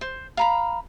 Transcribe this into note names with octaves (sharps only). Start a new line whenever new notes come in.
C5
F5 A#5 B5